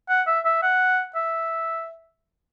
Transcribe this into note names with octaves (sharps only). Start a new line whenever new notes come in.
F#5
E5
E5
F#5
E5